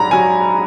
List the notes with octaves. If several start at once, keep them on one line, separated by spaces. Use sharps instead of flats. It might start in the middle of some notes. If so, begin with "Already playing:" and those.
Already playing: A#1 G#2 F#3 A#5 B5
F#3 G#5